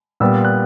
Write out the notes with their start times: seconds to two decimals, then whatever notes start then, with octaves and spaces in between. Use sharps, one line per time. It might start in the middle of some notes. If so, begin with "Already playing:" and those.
0.20 A#2 G3 B3 E6
0.45 F#6